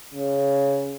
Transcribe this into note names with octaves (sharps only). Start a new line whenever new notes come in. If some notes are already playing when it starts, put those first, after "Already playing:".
C#3